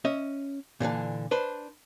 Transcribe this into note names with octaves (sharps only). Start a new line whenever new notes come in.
C#4 D#5 E5
A#2 D3 E3 D4
D4 B4 C5